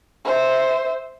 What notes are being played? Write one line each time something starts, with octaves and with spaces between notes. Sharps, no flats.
C5 E5